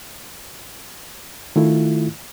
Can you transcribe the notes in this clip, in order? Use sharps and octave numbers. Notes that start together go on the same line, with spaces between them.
D#3 A3 E4 F4